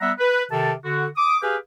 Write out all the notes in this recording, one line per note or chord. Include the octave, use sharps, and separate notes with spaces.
G3 B3 E5 F#5 A#5 E6
B4
C3 D#3 A4 A5
D3 F#4
D6 D#6
G4 G#4 B4 F5 G5 G#5